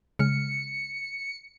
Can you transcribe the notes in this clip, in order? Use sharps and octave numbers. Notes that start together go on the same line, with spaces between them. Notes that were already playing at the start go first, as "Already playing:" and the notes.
C#3 G#3 F6 C#7